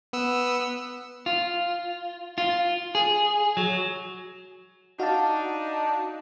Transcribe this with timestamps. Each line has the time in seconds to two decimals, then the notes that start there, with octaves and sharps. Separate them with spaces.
0.13 B3 E6
1.26 F4
2.38 F4
2.95 G#4
3.57 F#3
4.99 D4 D#4 F#4 F5 A5